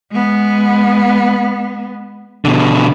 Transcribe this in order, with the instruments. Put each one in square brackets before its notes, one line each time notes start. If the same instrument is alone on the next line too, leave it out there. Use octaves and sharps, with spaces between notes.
[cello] G#3 B3
[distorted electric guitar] B2 D3